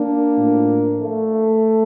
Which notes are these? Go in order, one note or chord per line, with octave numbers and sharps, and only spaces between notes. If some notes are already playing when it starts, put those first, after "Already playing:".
Already playing: A#3 D4
A2 F3
A3